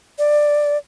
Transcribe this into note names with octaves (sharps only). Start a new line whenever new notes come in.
D5